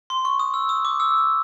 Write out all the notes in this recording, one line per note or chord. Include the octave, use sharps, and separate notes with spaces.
C6
C#6
D#6
E6
D#6
D6
E6